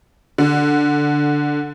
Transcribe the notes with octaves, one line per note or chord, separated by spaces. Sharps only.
D3